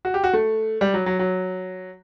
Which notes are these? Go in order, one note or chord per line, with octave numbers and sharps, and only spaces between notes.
F#4
G4
F#4
A3
G3
F#3
F#3
F#3